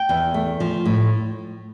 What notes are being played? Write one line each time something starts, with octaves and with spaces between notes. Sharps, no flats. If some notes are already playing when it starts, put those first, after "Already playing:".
Already playing: G5
E2
A3
F3
A2